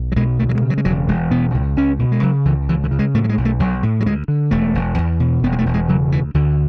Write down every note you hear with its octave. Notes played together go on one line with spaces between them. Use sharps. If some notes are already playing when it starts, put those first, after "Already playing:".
Already playing: B1
F#3
B2 G#3
D2 A3
F#3
G#3
C#3
F#3
G#3
E1 F#3
E1 G#3
B2 B3
C#2
C#2 C#4
B2
G#3
C#3 F#3
C#2 E3
C#2 E3
D3
C#3
G#3
A2 A3
F#3
G#3
B1
A3
B1 F#3
A2
F#3
D2 G#3
D3
E1 A3
E1
E2
B2
E1 B3
G#3
A3
E1
G#3
C#3 F#3
D2 E3
D2 D3